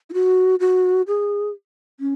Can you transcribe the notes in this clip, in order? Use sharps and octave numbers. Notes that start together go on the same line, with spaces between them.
E4
F#4
F#4
G#4
C#4